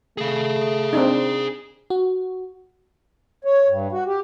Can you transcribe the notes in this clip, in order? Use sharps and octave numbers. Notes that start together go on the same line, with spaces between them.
A3 G#4 F5
C4 D4 D#4
F#4
C#5
G2
F#4
G4